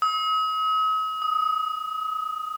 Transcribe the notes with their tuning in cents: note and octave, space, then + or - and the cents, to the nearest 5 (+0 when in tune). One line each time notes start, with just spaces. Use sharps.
D#6 +45
D#6 +5